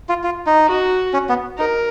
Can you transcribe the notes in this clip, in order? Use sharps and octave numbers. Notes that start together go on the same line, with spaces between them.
F4
F4
D#4
F#4
C#4
B3
D#4 A#4